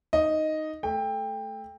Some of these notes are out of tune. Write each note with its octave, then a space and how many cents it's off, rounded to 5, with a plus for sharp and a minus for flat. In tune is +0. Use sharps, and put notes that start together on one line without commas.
D#4 +0 D#5 +0
A3 -10 G5 +20